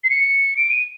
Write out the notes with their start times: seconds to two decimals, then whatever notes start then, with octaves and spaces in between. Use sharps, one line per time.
0.04 C7
0.10 C#7
0.57 D7
0.70 D#7